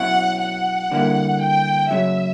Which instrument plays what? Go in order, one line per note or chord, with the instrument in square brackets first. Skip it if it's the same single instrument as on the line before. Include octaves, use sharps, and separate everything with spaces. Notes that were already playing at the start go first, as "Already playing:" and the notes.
Already playing: [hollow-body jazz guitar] B2 F#3 C#4 E4 [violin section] F#5
[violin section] F#5
[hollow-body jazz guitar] D3 G3 A#3 E4
[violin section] G5
[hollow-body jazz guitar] F#2 C#3 F#3 [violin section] E5